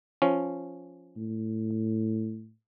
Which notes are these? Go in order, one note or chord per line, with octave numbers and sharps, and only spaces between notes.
F3 C#4
A2